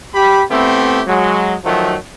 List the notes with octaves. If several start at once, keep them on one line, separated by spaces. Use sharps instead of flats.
G4 B5
A3 B3 C4 E4 G4
F#3 G#3
D#3 F3 F#3 A3